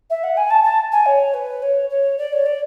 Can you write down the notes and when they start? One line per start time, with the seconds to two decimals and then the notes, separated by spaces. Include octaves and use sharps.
0.10 E5
0.24 F#5
0.37 G#5
0.50 A5
0.63 A5
0.92 G#5
1.06 C#5
1.34 B4
1.62 C#5
1.90 C#5
2.18 D5
2.33 C#5
2.46 D5